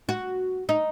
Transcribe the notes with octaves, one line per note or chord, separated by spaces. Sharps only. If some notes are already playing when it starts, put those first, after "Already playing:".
F#4
D#4